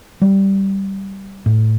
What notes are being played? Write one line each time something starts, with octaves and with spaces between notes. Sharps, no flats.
G3
A2